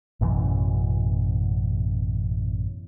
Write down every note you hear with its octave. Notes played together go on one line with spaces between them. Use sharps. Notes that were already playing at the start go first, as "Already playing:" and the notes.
A1 F#2 B2 E3